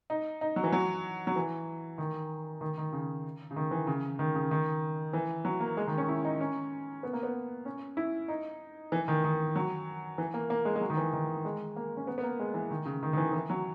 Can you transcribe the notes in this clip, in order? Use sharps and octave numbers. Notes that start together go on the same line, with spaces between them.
D#4
D#4
F#3
E3
F#3
F#3
E3
D#3
D#3
D#3
C#3
C#3
D#3
E3
C#3
D#3
C#3
D#3
E3
F#3
A#3
G#3
D#3
C#4
E4
D#4
C#4
B3
A#3
B3
C#4
E4
D#4
E3
D#3
D#3
F#3
E3
A#3
A#3
G#3
G#3
F#3
D#3
E3
D#3
G#3
A#3
C#4
B3
B3
A#3
G#3
E3
D#3
C#3
D#3
D#3
E3
E3
F#3